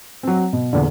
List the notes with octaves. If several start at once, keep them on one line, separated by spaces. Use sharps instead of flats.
F#3 C4
B2
E2 A#2 D3